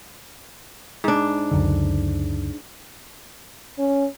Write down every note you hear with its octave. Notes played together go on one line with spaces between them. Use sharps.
G#2 D4
C#2 F#2 D3
C#4